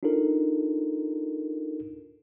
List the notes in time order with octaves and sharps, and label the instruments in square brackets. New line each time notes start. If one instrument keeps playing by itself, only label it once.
[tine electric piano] D4 D#4 F4 A4 A#4